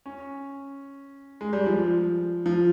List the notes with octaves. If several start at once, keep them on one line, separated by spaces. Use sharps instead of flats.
C#4
G#3
G3
F3
F3